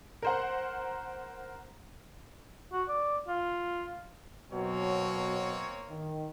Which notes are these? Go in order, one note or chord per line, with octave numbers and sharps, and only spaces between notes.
A#4 C5 F#5
F#4
D5
F4
B2 F#3 A#3 C4 C#5
D#3